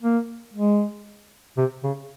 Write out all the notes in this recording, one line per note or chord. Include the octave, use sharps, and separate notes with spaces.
A#3
G#3
C3
C#3